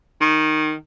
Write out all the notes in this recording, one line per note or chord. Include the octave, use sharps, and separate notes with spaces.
D#3